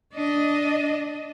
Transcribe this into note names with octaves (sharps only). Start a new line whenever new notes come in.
D4 D#5